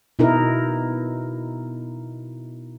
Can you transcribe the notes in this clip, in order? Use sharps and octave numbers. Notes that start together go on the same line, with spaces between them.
B2 D#4 E4 A#4